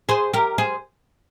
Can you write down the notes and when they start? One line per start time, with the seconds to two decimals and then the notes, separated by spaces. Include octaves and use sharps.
0.09 G#4 C5
0.33 G4 A#4
0.58 G#4 C5